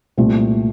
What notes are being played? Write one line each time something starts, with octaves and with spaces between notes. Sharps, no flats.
C2 A#2 A3 C4